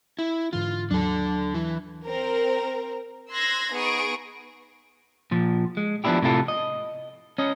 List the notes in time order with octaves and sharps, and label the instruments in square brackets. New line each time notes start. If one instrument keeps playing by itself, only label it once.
[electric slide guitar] E4
[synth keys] G#2 D3 E3 [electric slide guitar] F4
[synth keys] D#2 F#3 [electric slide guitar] D4 A4
[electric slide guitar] E3
[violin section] C4 A#4
C6 E6 F#6 G#6 A#6
B3 D#4 G#4 C#6 D#6 D7
[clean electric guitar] A#2 F3
G#3
F3 B3 C4 D4 E4 G4
A2 C3 E4 F4 A4
D#5
C#4 D#5